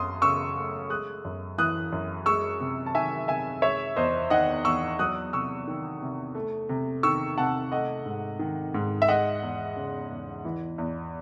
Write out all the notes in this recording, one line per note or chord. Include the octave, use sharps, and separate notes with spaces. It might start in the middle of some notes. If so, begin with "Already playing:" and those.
Already playing: F#2 F#3 C6 D#6
C#3 C#6 E6
A3
G#3 D#6 F#6
F#2
E3 D#6 F#6
F#2
G#3 C#6 E6
C3
A5
D#3 E5 G#5
C3 E5 G#5
G#3 C#5 E5
E2 C5 D#5
D#3 D#5 F#5
E2 C#6 E6
F#3 D#6 F#6
C3 C#6 E6
D#3
C3
A3
C3
D#3 C#6 E6
C3 F#5 A5
A3 D#5 F#5
G#2
D#3
G#2
E5
G#3 D#5 F#5
E2
C#3
E2
E3
E2